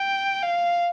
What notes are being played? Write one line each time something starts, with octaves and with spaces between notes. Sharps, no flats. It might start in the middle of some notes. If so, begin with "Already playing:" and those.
Already playing: G5
F5